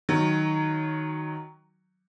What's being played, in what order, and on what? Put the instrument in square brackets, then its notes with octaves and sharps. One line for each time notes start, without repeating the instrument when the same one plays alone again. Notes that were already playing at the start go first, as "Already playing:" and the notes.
[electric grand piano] D#3 [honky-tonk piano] F#3